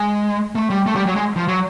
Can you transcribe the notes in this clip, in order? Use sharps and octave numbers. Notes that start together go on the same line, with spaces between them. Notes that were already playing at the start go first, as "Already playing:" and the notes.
Already playing: G#3
A3
G3
A3
G3
F#3
G#3
F3
F#3